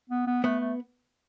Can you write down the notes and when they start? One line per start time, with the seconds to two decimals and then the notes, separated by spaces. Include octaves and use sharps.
0.09 B3
0.27 B3
0.43 A3 B3
0.60 A3